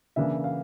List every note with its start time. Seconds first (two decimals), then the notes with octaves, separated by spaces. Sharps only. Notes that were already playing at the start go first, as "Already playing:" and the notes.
0.16 C#3 E3 A#3 D4 E5
0.44 F5